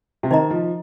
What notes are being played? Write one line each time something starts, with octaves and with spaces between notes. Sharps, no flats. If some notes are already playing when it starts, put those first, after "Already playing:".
C3
D#3 D#4 C5 D#5 A#5
F3